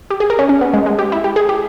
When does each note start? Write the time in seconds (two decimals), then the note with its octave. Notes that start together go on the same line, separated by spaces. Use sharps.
0.10 G4
0.20 G#4
0.30 A#4
0.39 C#4
0.49 C#4
0.61 B3
0.74 G#3
0.86 G#3
0.99 G4
1.12 E4
1.24 G4
1.36 G#4
1.49 G4